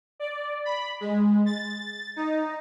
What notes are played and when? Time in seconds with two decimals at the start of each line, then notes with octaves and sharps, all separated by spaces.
0.20 D5
0.65 B5
1.01 G#3
1.46 A6
2.16 D#4